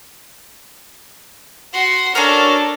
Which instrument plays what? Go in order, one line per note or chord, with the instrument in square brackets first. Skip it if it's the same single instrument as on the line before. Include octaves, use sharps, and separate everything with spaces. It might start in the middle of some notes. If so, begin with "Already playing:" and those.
[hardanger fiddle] F#4 C6
[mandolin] C#4 F#4 A#4 [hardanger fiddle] D4 A4